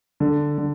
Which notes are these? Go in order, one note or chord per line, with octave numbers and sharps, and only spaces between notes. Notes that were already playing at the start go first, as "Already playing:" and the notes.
D3
D3